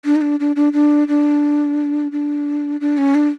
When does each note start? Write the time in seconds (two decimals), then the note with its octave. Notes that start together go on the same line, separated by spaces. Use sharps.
0.05 D4
0.16 D#4
0.21 D4
0.40 D4
0.56 D4
0.73 D4
1.08 D4
2.12 D4
2.81 D4
2.98 C#4
3.15 D4